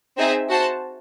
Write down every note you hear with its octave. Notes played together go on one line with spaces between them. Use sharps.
C4 D#4 G#4 C5 E5
F#4 C5 F#5 A5